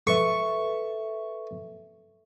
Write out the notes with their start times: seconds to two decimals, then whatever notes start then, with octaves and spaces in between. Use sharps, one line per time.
0.07 A4 B4 E5 C#6